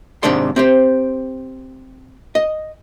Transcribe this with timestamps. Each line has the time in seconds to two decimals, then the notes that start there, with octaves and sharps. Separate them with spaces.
0.23 G#2 C3 D#3 D4 D5 C6
0.56 C4 G4 C5
2.35 D#5